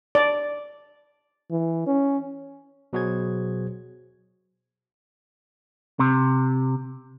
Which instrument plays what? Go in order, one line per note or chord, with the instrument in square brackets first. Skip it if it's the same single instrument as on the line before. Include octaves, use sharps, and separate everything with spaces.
[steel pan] D5
[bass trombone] E3
C#4
[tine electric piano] B2 F#3 F#4 G#4 C5 G#6
[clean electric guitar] C3